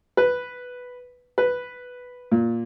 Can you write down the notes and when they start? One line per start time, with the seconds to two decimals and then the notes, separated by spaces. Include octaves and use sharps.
0.17 B4
1.38 B4
2.32 A#2